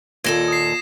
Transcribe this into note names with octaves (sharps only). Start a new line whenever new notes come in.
D#2 A#2 A4 G#6 A#6 E7
D#6 C7